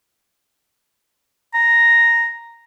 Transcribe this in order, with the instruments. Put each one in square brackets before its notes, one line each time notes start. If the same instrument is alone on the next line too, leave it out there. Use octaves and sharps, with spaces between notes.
[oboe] A#5